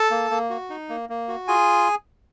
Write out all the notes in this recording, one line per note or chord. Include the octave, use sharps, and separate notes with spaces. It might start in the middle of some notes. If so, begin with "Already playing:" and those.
Already playing: A4 A5
A#3
A#3
F#4
D#4
A#3
A#3
F#4
F4 G#4 G#5